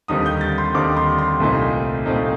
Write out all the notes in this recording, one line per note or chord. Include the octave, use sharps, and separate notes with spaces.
D#2 D3 G3 C4 D#4 D#6
G6
A6
C6
D#2 D3 G3 C4 D#4 D6
C6
C6
C2 A#2 A3 C4 D#4
C2 A#2 A3 C4 D#4